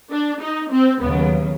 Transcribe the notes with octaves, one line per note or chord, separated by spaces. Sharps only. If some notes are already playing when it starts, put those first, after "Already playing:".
D4
D#4
C4
D#2 C#3 F#3 B3